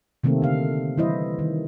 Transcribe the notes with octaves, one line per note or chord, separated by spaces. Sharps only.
C3 D#3 A3 A#3 C4
D3 F5
E3 G3 E4 C5 D#5
D#3